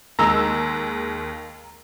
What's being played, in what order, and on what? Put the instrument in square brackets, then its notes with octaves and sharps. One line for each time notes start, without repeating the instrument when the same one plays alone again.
[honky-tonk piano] D#2 G#3 E6 [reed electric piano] A#5